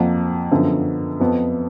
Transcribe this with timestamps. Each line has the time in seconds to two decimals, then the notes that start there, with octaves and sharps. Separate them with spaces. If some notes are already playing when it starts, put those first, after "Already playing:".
Already playing: F2 F3 A#3 F#5
0.51 F#2 D3 F3 B3
1.20 F2 F3 B3